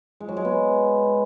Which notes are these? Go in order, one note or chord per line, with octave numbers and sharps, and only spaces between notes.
G#3
F#3
G#3
B3